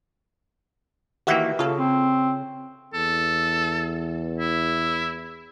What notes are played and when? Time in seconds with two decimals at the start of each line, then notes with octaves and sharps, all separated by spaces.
1.27 D#3 E3 A#3 F#4 G4 E5
1.59 C#3 F4 A4
1.78 C4
2.94 E2 A4
4.38 E4